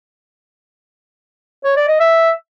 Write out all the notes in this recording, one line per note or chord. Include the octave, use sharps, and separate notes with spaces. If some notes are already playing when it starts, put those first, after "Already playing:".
C#5
D5
D#5
E5